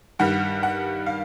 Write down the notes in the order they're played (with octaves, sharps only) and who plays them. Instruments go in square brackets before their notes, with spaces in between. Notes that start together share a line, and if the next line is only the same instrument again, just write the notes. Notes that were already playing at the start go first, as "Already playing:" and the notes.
[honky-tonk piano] G2 D#3 G3 F#5
F#5
F5